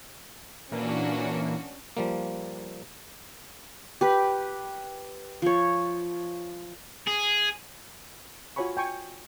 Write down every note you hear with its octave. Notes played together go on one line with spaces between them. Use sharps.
A#2 E3 A#3 C#4 D4 F#4
F3 G3 A#3
G4 B4
F3 C#5
G#4
F4 F#4 C#5 G#5 B5 C#6
G5 G#5 C#6